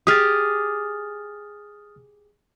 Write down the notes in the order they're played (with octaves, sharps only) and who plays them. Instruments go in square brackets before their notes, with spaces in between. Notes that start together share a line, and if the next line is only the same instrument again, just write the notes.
[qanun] G4 G#4 [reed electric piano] D#6 F6 A6